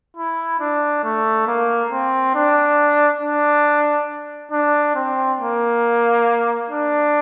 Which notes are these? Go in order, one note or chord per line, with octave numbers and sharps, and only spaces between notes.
E4
D4
A3
A#3
C4
D4
D4
D4
C4
A#3
D4